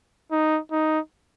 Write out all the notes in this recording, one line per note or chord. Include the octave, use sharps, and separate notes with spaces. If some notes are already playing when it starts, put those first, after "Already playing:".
D#4
D#4